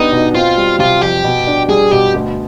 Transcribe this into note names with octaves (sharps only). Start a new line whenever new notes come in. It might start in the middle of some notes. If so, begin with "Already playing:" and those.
Already playing: B3 D4 D#4 G4
B2
C4 F4
G3
C3 F4
F2 G4
B2
D4
G3 G#4
B2 G4
D2